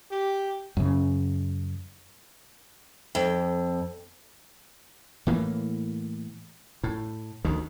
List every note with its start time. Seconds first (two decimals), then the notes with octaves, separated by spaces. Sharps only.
0.11 G4
0.77 F#2 C#3
3.15 F2
5.27 A2 E3 A#3
6.84 A2
7.45 D2 D#3